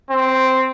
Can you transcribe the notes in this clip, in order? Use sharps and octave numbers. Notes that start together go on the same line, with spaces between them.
C4